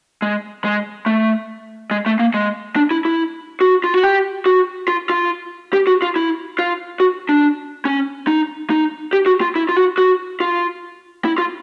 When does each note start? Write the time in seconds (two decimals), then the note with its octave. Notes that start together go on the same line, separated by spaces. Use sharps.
0.22 G#3
0.64 G#3
1.06 A3
1.91 G#3
2.06 A3
2.19 A#3
2.34 G#3
2.76 D4
2.91 E4
3.05 E4
3.61 F#4
3.84 F4
3.94 F#4
4.03 G4
4.46 F#4
4.88 F4
5.10 F4
5.73 G4
5.87 F#4
6.02 F4
6.16 E4
6.59 F4
7.00 F#4
7.29 D4
7.85 C#4
8.27 D#4
8.70 D#4
9.13 G4
9.26 F#4
9.41 F4
9.55 E4
9.69 F4
9.77 F#4
9.98 F#4
10.40 F4
11.25 E4
11.38 F4